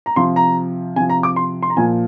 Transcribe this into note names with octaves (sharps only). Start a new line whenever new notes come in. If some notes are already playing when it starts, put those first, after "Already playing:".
A#5
C3 F3 C6
A#5
C3 F3 G#5
A#5
D6
C6
C6
A#5
A#2 F3 G#5